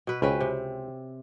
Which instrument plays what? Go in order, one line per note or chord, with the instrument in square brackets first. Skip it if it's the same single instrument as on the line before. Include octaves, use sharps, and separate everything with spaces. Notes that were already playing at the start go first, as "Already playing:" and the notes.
[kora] B2 B4
[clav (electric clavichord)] C#2 [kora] C4 C#4 B4
[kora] C3